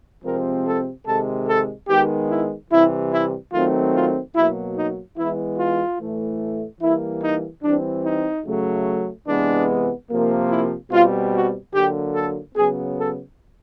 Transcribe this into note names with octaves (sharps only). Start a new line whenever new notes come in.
C3 F3 G#3 C4 A#4
A4
C3 D#3 G#3 A4
A4
D#3 G#3 B3 G4
E4
C3 E3 G3 E4
E4
D#3 F#3 A3 C4 F4
F4
B2 F#3 A#3 E4
D#4
E3 G#3 B3 E4
F4
A2 E3 A3
E3 G3 A#3 E4
D#4
E3 G3 C4 D4
D#4
C#3 F#3 A3
C3 E3 G#3 B3 D4
C3 F3 A#3
E4
B2 G3 C4 F4
F#4
D3 F#3 A#3 G4
A4
C#3 F#3 B3 G#4
A4